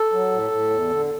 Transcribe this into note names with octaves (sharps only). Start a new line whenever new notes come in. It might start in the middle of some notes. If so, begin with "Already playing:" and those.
Already playing: A4
F#3
A2
A2
E2
D3